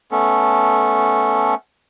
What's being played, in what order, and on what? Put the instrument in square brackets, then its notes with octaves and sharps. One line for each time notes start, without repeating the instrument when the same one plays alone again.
[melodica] A3 B3 C#4 A4